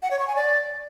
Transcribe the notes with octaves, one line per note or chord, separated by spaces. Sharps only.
F#5
C#5
C#6
G#5
D5